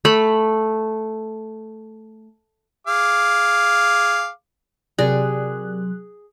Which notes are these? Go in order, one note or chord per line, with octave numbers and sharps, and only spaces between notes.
A3 B5
G#4 F5 D6
C3 F#3 G4 G#4 A#4 D5 F#6